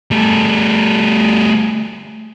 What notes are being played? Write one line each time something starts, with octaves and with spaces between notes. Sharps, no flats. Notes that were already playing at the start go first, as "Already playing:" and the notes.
G3 A3